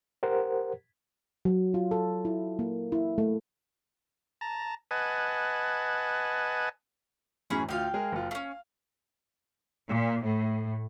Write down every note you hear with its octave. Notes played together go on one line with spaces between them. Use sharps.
G4 A#4 C5 F#5
F#3
F4
A4
E4
A#3
E4
A3
A5 A#5
B4 D#5 F#5 G#5 A5
F#2 A2 E3 C#4 G#4 B5
D2 F4 F5 G5
G#3 G#4 A#4
F#1 F4
A3 C#4 F5
A#2
A2